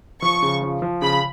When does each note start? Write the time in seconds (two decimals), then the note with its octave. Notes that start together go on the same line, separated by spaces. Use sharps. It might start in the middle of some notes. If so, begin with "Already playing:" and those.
0.22 F3 C#6
0.42 C#3
0.62 F3
0.82 F3
1.02 C#3 B5